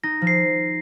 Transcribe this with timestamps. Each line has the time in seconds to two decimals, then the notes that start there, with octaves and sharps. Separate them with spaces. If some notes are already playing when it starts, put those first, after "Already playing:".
0.04 D#4 A#6
0.22 F3
0.27 C7